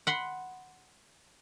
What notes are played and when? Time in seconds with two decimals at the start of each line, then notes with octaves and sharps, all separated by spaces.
0.07 F#5 B5 C6